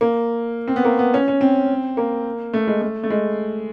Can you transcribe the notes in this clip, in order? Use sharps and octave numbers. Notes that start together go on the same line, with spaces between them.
A#3
C4
B3
A#3
B3
C#4
C#4
C4
A#3
A3
G#3
A3
A3
G#3